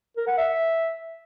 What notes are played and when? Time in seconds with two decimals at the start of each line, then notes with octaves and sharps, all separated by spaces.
0.17 A#4
0.27 F#5
0.38 E5